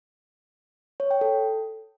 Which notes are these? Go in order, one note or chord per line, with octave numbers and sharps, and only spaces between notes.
C#5
G5
A4